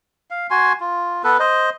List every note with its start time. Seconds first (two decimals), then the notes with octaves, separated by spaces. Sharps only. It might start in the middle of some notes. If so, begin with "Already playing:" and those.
0.30 F5
0.50 F#4 G#5 C6
0.80 F4
1.24 B3 A4 B4
1.40 C5 D#5